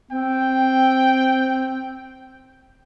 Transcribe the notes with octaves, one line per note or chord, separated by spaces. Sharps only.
C4 G5